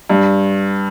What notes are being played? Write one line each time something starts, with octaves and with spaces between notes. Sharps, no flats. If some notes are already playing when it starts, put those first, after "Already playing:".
G2